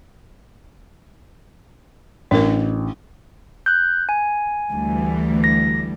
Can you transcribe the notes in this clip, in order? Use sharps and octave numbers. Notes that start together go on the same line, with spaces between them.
A1 D4 A#4
F#6 G6
G#5
D2 E3 G3
A#6